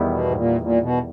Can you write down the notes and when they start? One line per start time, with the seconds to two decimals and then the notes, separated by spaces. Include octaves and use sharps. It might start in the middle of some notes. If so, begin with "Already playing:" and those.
Already playing: E2 D#3 G3 B3 E4
0.09 B2
0.25 G#2
0.35 A#2
0.61 A#2
0.81 B2